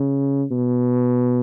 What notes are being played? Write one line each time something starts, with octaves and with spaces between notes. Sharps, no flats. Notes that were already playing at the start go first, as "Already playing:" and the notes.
Already playing: C#3
B2